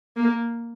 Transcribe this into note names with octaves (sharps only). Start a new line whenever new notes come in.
A#3